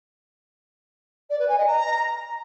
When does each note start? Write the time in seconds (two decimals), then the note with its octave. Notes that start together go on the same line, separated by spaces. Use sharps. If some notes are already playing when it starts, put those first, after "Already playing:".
1.29 D5
1.38 B4
1.48 G#5
1.57 D#5
1.66 A#5